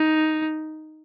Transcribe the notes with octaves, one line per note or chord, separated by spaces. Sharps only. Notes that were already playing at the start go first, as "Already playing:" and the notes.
Already playing: D#4